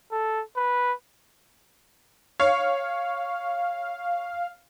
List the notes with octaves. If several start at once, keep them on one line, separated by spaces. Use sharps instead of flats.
A4
B4
C#5 F5